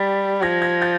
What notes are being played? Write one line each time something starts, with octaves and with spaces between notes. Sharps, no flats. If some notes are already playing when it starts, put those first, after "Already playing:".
Already playing: G3 A6 B6
F3 G#6 A#6
G#6 A#6
G6 A6